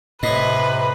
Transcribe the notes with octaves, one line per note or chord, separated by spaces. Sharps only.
A2 C3 B4 C#5 D#5